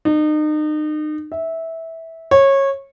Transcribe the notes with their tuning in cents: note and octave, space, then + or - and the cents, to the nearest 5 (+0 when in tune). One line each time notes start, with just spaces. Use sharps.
D#4 -35
E5 -15
C#5 -20